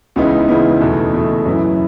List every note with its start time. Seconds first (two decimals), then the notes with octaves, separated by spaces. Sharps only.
0.16 C#2 C#3 E3 B3 D#4
0.48 C#2 C#3 E3 B3 D#4
0.81 E2 B2 A3
1.13 E2 B2 A3
1.45 F#2 E3 B3 E4